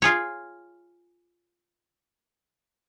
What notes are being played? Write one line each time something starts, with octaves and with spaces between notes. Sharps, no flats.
F4 G#4 C#5